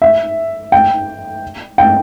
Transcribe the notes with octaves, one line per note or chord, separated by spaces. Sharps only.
E5
G5
G5